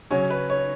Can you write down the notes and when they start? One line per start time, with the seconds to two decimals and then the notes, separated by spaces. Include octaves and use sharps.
0.10 C#3 F#3 C#4 F#4 C#5
0.30 B4
0.50 C#5